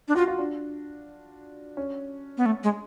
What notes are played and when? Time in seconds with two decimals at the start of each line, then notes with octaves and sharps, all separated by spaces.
0.08 D4
0.16 F4 F#4
0.28 F4
0.39 D4
1.77 C#4
2.38 B3
2.46 A3
2.64 G#3